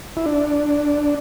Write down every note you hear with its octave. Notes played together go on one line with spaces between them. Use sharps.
E4
D4